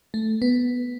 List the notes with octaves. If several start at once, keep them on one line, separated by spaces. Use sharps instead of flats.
A3
B3